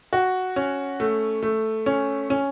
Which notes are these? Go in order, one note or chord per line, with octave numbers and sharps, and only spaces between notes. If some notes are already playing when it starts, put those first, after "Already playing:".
F#4
C#4
A3
A3
C#4
C#4